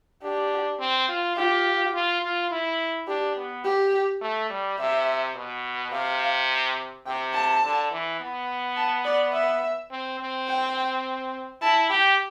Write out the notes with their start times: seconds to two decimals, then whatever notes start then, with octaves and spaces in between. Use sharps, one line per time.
0.23 D4 G4
0.79 C4
1.09 F4
1.36 F4 G4
1.94 F4
2.22 F4
2.51 E4
3.07 D4 G4
3.36 B3
3.65 G4
4.21 A3
4.50 G3
4.78 C3 E5
5.35 B2
5.92 C3 F5
7.06 C3 G5
7.34 A5
7.63 D3
7.91 E3
8.20 B3
8.76 A5
9.05 D5
9.33 E5
9.91 C4
10.20 C4
10.48 G5
11.61 E4 A5
11.90 G4 G5